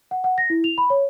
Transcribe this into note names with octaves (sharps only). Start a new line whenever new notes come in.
F#5
F#5
A#6
E4
F7
B5
C#5